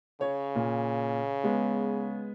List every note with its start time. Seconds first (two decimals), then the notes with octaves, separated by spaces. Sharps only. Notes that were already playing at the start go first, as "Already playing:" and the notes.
0.21 C#3 C#5
0.56 A#2
1.44 G#3 B3